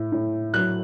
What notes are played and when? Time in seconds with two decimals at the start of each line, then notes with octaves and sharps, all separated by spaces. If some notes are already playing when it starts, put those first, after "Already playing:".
Already playing: A2
0.12 A2
0.54 F#3 F#6